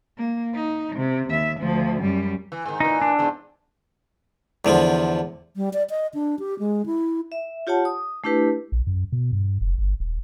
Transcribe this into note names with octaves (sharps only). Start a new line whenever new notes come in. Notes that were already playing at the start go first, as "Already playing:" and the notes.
A#3
D#4
C3
D#2 E5
D2 F3
F#2 G3
E3
G#2 D#3
A#2 E3 D#4
D4
E2 G#2
E2 D3 F3
G3
D5
D#5
D4
G4
G#3
E4
E5
F4 G4 C#5 F#5 A5
D#6
A3 D4 E4 G4 B4
A#1
F#2
B2
G2
F1
G1
D#1